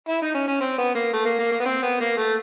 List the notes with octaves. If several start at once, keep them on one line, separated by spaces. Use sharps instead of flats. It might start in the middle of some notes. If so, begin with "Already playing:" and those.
E4
D#4
C#4
C#4
C4
B3
A#3
A3
A#3
A#3
A#3
B3
C4
B3
A#3
A3